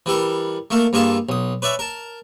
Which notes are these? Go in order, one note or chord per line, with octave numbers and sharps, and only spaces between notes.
E3 G3 A4 A#4
A3 A#3 A4 A#4
G2 A#3 F4 G#4 A4 A5
B1 D#6
B4 C#5 D5 E5 G#5
A#4 A5